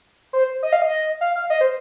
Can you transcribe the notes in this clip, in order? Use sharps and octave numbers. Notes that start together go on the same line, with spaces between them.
C5
D#5
F5
D#5
F5
F5
D#5
C5